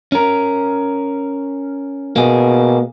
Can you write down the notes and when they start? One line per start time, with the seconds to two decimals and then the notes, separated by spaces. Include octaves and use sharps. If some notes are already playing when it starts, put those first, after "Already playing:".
0.12 C#4 A#4
2.16 B2 A#3 G#4